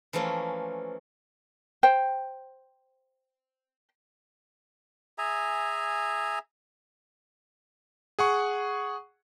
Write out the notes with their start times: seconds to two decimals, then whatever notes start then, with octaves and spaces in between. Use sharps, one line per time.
0.13 E3 F3 A3 A#3 C#4
1.83 C5 G5
5.18 G#4 E5 G#5 A#5
8.19 G#4 F#5 C#6